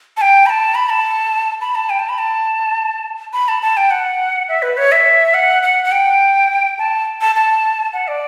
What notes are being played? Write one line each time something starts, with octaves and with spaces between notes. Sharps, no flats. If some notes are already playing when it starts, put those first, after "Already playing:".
A5
G5
B5
A5
B5
A5
B5
A5
G5
A5
B5
A5
B5
A5
A5
G5
F#5
E5
B4
C#5
E5
F#5
F#5
F#5
G5
A5
A5
A5
F#5
D5